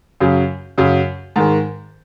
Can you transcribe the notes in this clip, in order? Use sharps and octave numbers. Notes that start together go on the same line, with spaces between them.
F#2 C#3 F#3
F#2 C#3 F#3
G#2 D#3 G#3